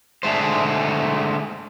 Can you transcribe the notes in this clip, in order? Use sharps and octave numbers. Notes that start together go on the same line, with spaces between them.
D3 G#3 A3 C5